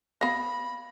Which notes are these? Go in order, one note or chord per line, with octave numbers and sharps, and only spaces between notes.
B3 F5 B5 A#6